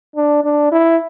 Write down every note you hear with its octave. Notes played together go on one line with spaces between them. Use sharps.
D4
D4
E4